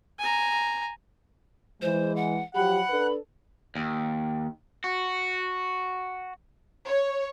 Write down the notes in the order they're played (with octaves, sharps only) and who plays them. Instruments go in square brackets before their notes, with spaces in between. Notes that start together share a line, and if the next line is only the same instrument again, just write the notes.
[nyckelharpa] G#5 A#5
[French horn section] E3 G#3 [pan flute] C5
[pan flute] F#5
[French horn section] F3 F#3 G4 [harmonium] F#5 [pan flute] B5
[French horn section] D4 A4 B4
[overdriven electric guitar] D#2
F#4
[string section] C#5